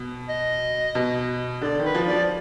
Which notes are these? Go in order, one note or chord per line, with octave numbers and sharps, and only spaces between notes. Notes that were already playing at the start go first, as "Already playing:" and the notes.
Already playing: B2
D#5
B2
D3 D5
D#3
B4
F3
F3 D5